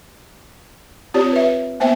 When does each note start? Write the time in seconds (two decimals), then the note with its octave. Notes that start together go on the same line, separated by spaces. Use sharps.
1.14 C4 F4 G4 C#5 D5
1.32 B4 E5
1.80 A#3 B3 C5 E5 G5